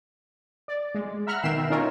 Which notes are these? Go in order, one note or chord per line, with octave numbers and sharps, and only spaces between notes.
D5
G#3
E5 F#5 A#5 B5 F6 F#6
B2 D#3 E5 G5 C7 E7
C#4 D#4 F4 A#4 C#5